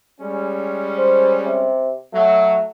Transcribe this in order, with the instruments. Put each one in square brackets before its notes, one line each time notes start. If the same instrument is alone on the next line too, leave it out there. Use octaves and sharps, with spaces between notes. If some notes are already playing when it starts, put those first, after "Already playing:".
[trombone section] G3 G#3 C#4
[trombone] C5
C3
[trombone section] F#3 [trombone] A3